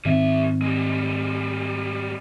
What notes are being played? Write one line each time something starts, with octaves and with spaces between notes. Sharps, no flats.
G#2 D#3 G3 C4 E5
G3 G#3